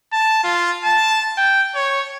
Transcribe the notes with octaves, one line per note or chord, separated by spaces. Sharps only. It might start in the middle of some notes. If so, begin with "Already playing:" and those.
A5
F4
A5
G5
C#5